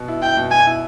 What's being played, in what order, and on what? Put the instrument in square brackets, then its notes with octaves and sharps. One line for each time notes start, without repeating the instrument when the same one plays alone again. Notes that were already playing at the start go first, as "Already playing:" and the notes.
Already playing: [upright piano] B2
E4
[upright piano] E4 [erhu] G5
[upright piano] B2
[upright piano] B2 [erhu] G#5
[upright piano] E4